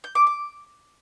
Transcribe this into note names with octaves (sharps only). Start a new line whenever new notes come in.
G6
D6
D6